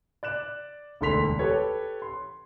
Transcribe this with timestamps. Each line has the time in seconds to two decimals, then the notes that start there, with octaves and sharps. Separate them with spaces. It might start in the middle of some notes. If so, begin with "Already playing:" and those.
0.23 D5 F#6 E7
1.01 E1 D2 D3 C6 B6 F7
1.39 G4 A4 B4 C#5
2.02 C6